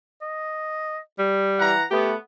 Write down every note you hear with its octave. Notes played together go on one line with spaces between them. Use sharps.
D#5
G3
E3 F#5 A#5
A3 B3 G4